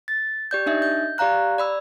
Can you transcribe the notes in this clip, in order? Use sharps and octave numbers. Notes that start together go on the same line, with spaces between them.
A6
G4 D5 G6
D4 D#4 D#5 E5
G6
G4 D5 F5 A#5 F#6
D5 B5 E6